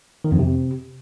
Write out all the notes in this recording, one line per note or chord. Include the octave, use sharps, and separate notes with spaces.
D#3
F2
C3